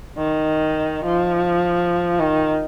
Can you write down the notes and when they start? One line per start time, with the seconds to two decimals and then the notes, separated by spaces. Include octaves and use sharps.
0.17 D#3
1.04 F3
2.19 D#3